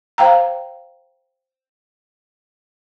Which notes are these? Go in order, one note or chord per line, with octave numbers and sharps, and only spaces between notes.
C5 F5 G5 A#5